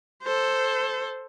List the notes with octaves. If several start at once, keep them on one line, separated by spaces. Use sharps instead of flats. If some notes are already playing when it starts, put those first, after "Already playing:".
A4 C5